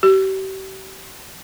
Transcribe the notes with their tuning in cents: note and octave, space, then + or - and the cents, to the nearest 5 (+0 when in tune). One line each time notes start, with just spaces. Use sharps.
G4 -40